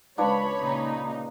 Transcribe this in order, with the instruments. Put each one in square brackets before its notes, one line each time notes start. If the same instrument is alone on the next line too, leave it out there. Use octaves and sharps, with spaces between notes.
[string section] C#2 [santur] F3 D4 B4 [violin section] C#5 B5
[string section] A#2 C#3 D#4